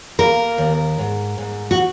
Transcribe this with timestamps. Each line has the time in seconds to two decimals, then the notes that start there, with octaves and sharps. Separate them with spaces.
0.19 A#3 A#4
0.58 D#2
0.98 G#2
1.38 G#2
1.71 F#4